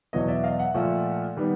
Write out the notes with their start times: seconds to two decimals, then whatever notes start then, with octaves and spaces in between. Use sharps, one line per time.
0.13 E2 B2 F#3 B3 C#5 D#5
0.28 D5 E5
0.44 D#5 F5
0.59 E5 F#5
0.74 A#2 F3 A3
1.37 D#3 G3 B3